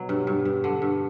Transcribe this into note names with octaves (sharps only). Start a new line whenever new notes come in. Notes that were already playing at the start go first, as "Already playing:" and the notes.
Already playing: B2 F#3
G2
G2
G2
D3
G2